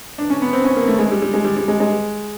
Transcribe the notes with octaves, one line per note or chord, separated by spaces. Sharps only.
D4
C#4
B3
C4
C#4
A#3
A3
G#3
G3
G3
G#3
G3
G3
G#3
G#3